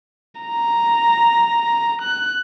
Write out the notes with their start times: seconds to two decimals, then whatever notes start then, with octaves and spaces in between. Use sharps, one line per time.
0.41 A#5
2.02 F#6